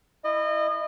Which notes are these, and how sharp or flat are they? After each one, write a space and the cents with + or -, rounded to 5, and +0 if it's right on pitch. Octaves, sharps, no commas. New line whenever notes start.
E4 +0 D#5 -30